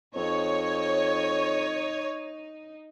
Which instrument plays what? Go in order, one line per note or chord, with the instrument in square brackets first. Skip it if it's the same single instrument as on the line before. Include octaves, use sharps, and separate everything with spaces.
[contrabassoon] F2 [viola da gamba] D#4 [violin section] C#5